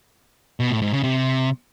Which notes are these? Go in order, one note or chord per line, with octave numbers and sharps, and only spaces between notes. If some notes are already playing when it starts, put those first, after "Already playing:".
B2
A2
G#2
C#3
C3